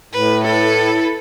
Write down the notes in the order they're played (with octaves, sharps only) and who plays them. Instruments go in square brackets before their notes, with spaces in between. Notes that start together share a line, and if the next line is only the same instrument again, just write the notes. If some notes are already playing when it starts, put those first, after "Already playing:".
[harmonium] A2 [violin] B4
[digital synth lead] E4 [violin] A4 B4